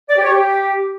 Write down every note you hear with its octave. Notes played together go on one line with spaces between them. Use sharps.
D5
G4
C#5
G4